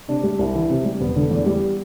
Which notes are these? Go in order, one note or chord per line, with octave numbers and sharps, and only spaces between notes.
C3 D4
G3
C2
E3
C3
G3
E1 B3
D3
E2
G3